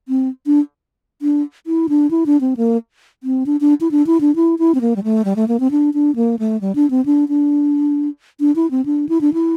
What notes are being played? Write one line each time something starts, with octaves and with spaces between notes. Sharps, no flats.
C4
D4
D4
E4
D4
E4
D4
C4
A#3
C4
D4
D4
E4
D4
E4
D4
E4
E4
C4
A#3
G3
A3
G3
A3
A#3
C4
D4
D4
A#3
A3
G3
D4
C4
D4
D4
D4
E4
C4
D4
E4
D4
E4